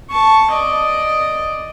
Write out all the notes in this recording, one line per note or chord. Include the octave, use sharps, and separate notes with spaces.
A5 C#6
D5 D#5